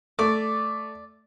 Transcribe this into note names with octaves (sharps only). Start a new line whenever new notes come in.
A3 D5 D6